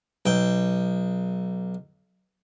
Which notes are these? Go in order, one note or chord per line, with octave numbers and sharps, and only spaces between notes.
B1 G5